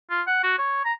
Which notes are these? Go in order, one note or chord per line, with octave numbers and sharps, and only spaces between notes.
F4
F#5
F#4
C#5
A#5